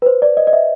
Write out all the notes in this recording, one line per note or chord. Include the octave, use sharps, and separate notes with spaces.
B4
C5
D5
D#5
D#5
E5